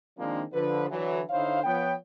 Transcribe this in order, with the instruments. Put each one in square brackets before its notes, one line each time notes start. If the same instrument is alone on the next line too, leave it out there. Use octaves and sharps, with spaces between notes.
[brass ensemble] D#3 F3 G#3 A#3 C4 D4
D3 F3 B4
D3 E3 F#3
D3 D#4 E4 C5 C#5 F5
F3 B3 C#5 G5